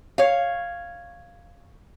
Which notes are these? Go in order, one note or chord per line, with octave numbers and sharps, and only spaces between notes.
C#5 F5